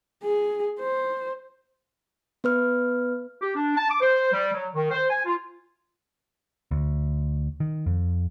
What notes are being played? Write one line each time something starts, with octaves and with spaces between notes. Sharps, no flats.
G#4
C5
B3 B4 F6
G4
D4
A5
D6
C5
G3
F#3
D#3
C5
G#5
F4
D2
D#3
F2